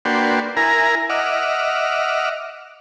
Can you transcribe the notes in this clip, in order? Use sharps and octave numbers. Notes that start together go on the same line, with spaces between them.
A#3 D4 F#4 B4 G5 C6
E4 A#4 G#5 A#5
D#5 E5 F#5 D6 F6